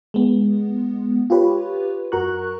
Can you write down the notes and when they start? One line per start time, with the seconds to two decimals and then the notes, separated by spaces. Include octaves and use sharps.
0.14 G#3 B3
1.30 F4 G4 B4 C#5
2.12 F#2 F#4 A#4 A#5 C#6 F#6